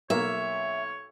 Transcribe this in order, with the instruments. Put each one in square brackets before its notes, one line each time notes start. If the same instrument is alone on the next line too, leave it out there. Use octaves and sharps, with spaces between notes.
[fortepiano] B1 A#3 F5 [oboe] C#5 [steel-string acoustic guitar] E5